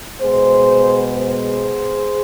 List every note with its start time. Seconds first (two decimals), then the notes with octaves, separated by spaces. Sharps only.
0.21 B2 G#3 B3 G#4 C5
1.16 G#4 C5